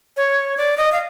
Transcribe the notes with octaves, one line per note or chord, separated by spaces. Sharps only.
C#5
D5
D#5
F5